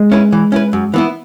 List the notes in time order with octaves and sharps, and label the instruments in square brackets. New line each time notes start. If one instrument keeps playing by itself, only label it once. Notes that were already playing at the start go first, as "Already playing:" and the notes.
Already playing: [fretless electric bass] G#3
[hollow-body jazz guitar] C#4 E4 B4
E3
C#4 E4 B4
F#2
E3 B3 E4